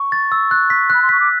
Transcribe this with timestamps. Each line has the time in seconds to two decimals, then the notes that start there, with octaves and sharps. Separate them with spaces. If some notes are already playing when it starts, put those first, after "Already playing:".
Already playing: C#6
0.12 A6
0.32 E6
0.51 F#6
0.70 B6
0.90 B5 F#6
1.02 C6
1.09 C#6 B6
1.20 D6